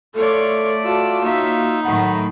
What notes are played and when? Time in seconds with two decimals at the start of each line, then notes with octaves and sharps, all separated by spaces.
0.15 A3 F4 A4 C#5 D5
0.85 F4 F#4 A4 A5 E6
1.23 A#3 D#4 C#5 E5
1.83 A2 D#3 F#3 F#5 B5